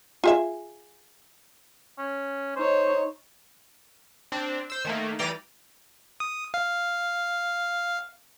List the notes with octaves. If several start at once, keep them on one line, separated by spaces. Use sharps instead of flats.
F4 G#4 E5
C#4
D#4 C5 C#5
C4 D4
C5 E6
D#3 A3 A#3
E3 G3 D5 G5 A#5 D#7
D#6
F5